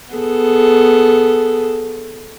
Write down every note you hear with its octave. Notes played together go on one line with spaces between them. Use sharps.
B3 G#4 A4